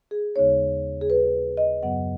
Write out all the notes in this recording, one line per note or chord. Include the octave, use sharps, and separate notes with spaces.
G#4
D#2 C#3 G#3 B3 D#4 C#5
G#4
B4
D#5
F#2 C#3 F#3 B3 F#5